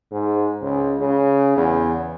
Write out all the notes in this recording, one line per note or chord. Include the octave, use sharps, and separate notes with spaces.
G#2
C#2
C#3
E2